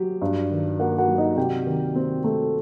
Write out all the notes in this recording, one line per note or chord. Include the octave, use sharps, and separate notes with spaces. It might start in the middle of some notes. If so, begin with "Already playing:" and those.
Already playing: F#3 G4
G2
D#3
A#3 F#4 F#5
F#4 F#5
F#3
D#4 D#5
C3 G4 G5
D#3
C4
A3